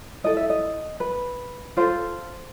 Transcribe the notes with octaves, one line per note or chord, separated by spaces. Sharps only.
E4 A4 D#5
E5
D#5
B4
F4 A4 C5